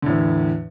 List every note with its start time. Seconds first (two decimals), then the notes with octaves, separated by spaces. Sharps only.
0.02 D3
0.06 A2
0.10 E2